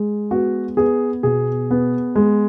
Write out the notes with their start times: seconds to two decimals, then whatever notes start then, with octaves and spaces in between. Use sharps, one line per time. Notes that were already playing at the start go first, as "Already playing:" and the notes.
Already playing: G#3
0.31 B3 F#4
0.77 B3 G#4
1.23 B2 G#4
1.71 B3
2.16 G#3